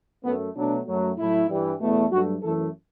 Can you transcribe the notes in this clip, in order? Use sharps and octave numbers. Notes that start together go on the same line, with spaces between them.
F#2 F#3 A3 B3
B2 F#3 A3 D4
F#2 F#3 A3
A2 F#3 A3 E4
G2 E3 G3
E2 B2 A3
G2 F#3 A3 F#4
F#2 E3 A3 A4